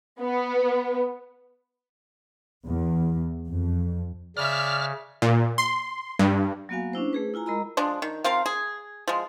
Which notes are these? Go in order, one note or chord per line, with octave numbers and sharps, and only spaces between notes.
B3
E2
F2
C#3 D5 E5 F6
A#2
C6
G2
F#3 A#3 B3 F#4 F5 G#5
C#4 D4 E4 C5
A3 G#4 B4
E4 F4 G#5 A#5
G#3 A#4 D#5 A#5 B5 E6
F3 G#3 D4
D#3
F3 C4 A#4 F5
G#4
F3 G#3